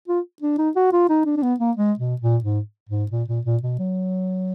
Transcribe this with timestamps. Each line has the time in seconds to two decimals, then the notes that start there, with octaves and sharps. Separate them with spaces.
0.08 F4
0.42 D4
0.58 D#4
0.76 F#4
0.93 F4
1.09 D#4
1.26 D4
1.37 D4
1.43 B3
1.60 A#3
1.77 G#3
1.99 B2
2.22 A#2
2.44 G#2
2.89 G#2
3.12 A#2
3.28 A#2
3.45 A#2
3.63 B2
3.79 F#3